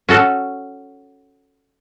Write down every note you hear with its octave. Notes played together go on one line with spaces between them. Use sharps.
C#4 F#4 A4